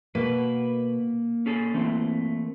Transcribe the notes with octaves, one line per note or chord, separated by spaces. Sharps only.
B2 A#3 B4
C#4 G#4 A4
E3 A3 C4